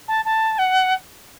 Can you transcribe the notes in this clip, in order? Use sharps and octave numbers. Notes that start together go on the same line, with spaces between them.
A5
A5
F#5